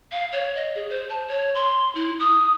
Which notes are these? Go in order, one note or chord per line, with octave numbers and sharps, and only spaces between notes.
F5
C#5
D#5
G#4
C5
A5
C#5
C6
E4
D#6